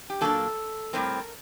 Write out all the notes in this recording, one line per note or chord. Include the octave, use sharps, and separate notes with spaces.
G4
A#2 F#3 A#3 D4 A4
A2 G3 C4 A#4